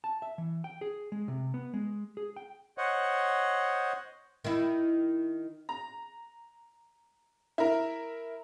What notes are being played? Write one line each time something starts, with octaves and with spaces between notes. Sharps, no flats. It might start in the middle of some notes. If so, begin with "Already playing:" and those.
A5
E5
E3
G5
G#4
G#3
C3
B3
G#3
G#4
G5
C5 C#5 D#5 F#5
D#3 E4
A#5
E4 A#4